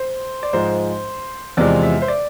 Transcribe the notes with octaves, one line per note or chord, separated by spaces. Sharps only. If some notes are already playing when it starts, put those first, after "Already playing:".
Already playing: C5
D5
G#2 F3 G#3 C5
E2 C3 F3 G#3 D5
E5
C5
D5